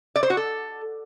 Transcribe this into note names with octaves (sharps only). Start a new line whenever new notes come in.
D5
C5
F#4
A4